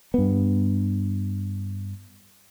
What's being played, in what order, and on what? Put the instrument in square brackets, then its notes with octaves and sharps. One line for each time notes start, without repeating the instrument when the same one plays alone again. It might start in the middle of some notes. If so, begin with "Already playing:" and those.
[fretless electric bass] G2 B3